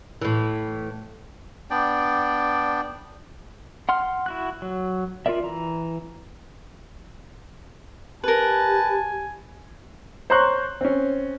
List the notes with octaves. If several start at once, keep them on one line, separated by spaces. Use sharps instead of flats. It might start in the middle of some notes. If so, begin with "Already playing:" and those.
A2 E3
B3 D4 D5 G5
F#5 C6 F6
E4 F#4 F#6
F#3
F4 G4 A#4 D5 E5
E3 A#5
G4 A#4 B4 G#5 A5
C5 C#5 A#5 C6 C#6 F#6
C4 C#4